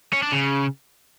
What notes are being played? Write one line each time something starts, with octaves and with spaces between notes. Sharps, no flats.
C#4
D4
C#3